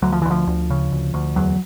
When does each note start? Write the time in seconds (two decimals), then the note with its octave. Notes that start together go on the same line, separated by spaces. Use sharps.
0.02 D2 F#3
0.12 F3
0.22 E3
0.25 D2
0.31 F3
0.47 D2
0.70 C#3
0.92 D2
1.14 D2
1.36 E2 F#3